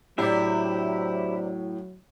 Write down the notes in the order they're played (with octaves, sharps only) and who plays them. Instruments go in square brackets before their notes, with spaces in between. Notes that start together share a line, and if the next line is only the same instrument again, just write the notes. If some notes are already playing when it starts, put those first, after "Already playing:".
[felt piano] A2 [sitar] C3 D4 [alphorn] F#3 [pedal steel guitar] E4 G4 E5